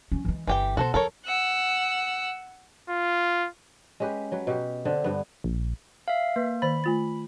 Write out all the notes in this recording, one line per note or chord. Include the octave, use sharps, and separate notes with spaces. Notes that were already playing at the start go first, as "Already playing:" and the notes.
F3 C#4
E3 G#3
G1 E3 G4 G5
B2 F#4 A4 C5
F2 A4 A#4 C#5
F#5 E6
F4
G#3 C#4 G4 B4
F#3 B4
B2 G4
D3 C4 D4
G2 B3
A#1
E5 F5
A#3 B4
D#3 C5 B5 A6
A3 F4 A6